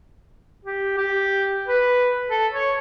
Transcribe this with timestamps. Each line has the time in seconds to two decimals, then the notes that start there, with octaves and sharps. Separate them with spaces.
0.65 G4
0.98 G4
1.68 B4
2.31 A4
2.53 C#5